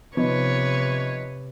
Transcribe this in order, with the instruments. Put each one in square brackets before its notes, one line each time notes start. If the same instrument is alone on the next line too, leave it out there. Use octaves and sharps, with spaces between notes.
[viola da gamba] C3 B4 C#5 [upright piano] F3 B3 D#4